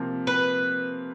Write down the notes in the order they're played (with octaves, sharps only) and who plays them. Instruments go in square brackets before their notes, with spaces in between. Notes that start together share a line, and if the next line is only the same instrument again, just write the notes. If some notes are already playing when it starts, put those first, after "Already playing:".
Already playing: [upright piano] C3 F3 A#3
[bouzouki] B4